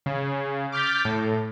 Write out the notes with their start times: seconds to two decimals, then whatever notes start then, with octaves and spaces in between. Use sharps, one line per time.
0.06 C#3
0.72 D6 F6 G6 A6 B6
1.05 A2